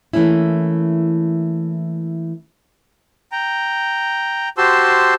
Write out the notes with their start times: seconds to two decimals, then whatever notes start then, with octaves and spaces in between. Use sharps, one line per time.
0.13 E3 A3 A#3 C#4 E4
3.32 G5 A#5
4.58 F#4 G4 C5 A5 C6 E6